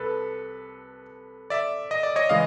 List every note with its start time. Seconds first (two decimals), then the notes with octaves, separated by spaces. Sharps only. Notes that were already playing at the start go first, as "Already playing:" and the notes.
Already playing: C2 A4 B4
1.50 D5 E5
1.91 D#5
2.03 D5
2.16 C#5 D#5
2.29 C#3 E3 G#3 D#5 F5